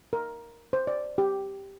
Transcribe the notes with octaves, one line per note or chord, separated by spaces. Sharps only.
A#4
C5
D5
G4